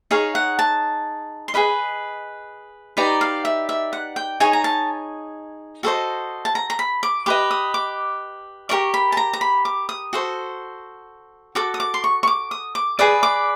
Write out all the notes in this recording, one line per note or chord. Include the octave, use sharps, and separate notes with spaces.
D#4 G#4 C#5 F5
F#5
A5
C6
G#4 B4 D#5 B5
D#4 G4 B4 D5 A#5
F5
E5
E5
F#5
G5
D#4 G#4 C#5 G#5
A#5
A5
F#4 A4 C5 D#5
A5
A#5
A#5
B5
D6
G4 B4 D#5 D6
D#6
D6
G4 A#4 D5 C#6
B5
A5
A#5
A#5
B5
D6
D#6
F#4 A4 C5
F#4 A4 D6
D#6
D6
C6
C#6
C#6
D6
D#6
D6
G#4 B4 D5 D#6
D6